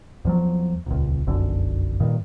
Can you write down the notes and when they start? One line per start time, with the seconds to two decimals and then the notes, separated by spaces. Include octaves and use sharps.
0.25 E2 F3 F#3
0.86 D#1 C#2
1.27 F1 B1 F#2 D3
2.00 G2 A#2 D#3